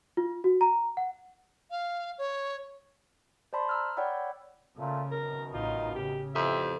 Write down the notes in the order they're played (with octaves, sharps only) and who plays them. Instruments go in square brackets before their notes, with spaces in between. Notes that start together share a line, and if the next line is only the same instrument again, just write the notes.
[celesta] F4
F#4
A#5
F#5
[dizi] F5
C#5
[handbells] C5 D5 A5 B5 C6
A#5 E6 F6
C#5 D5 F#5 G5 B5 E6
[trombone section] A#2 A3 F4 [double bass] C#3
[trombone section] F#2 B2 D#3 [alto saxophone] A#4
[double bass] A1 D#4 [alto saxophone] F4
[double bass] C#3 [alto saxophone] G4
[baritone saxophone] F2 [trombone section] E3 A3 G4 [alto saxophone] E5